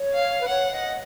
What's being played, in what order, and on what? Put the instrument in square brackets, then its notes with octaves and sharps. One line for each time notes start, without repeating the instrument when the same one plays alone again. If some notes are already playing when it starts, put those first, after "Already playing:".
Already playing: [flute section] C#5
[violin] F5
[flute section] B4
[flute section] C#5 [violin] F#5
[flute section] D#5